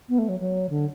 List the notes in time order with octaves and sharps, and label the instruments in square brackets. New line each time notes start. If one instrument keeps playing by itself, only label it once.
[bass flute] B3
A3
F#3
F#3
D3